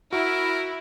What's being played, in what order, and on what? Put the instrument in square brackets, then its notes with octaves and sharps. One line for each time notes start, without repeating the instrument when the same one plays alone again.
[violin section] E4 [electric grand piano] F#4 [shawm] A#4